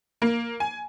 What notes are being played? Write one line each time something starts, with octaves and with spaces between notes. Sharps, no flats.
A#3
G#5